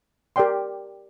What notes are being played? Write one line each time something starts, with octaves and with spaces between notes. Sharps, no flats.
G4 A#4 D5 G5 C6